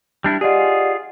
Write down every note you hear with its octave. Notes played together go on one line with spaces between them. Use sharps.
G3 D4 E4
F4 G4 G#4 D5 D#5 F#5